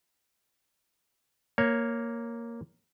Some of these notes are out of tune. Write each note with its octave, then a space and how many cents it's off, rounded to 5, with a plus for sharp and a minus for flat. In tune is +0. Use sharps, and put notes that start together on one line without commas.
A#3 +0 C#5 +0